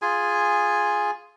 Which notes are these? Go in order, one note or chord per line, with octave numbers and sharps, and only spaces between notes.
F4 G#4 G#5